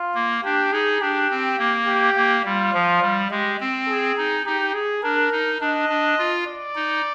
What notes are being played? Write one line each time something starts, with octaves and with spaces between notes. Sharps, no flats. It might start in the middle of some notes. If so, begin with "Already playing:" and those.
Already playing: F4
A#3
D4 G4
D#4 G#4
D4 G4
C4
A#3
G4
A#3
G3 F4
F3
G3
G#3 G4
C4
G#4
D#4
D#4 G4
G#4
D4 A#4
D#4
D4 D#5
D4
F4
D5
D#4